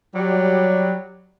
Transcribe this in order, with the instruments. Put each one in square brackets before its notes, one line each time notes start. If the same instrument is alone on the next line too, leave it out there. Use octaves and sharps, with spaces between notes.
[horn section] F#3 G3